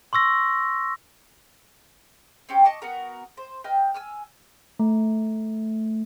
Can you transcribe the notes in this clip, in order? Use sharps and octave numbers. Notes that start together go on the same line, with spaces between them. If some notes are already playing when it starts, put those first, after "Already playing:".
C6 C#6 E6 A#6
C4 C#4 G4
D#5 A5 C#6 D6
B3 F#4 A#4
C5
B4 D#5 G5 F6
G#5 E6 F6
A3